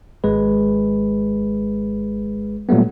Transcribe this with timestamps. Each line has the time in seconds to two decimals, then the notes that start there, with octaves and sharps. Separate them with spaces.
0.24 G#1 G#3 B4
2.69 A#2 F#3 G3 A3 B3